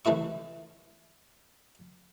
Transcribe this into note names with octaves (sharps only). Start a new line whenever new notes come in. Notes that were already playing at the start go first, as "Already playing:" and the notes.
C2 E3 A3 E4 C#6